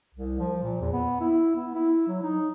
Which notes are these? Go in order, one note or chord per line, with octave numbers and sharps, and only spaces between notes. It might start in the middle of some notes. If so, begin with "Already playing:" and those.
C2
F3
A#2
E2
B3
E4
B3
E4
F#3
D#4